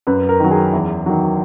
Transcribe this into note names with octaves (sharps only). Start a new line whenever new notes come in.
F#2 B4
A#4
D#3 F#3
G#4
E2 E4
D#3 F#3